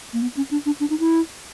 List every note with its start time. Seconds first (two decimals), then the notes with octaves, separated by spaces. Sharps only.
0.13 A#3
0.22 B3
0.37 C#4
0.51 D4
0.66 D4
0.80 D4
0.90 D#4
1.00 E4